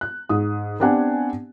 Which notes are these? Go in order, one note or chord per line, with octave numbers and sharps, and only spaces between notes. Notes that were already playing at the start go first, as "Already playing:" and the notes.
F#6
G#2 D#6
B3 C4 D4 G4 F#5 G#5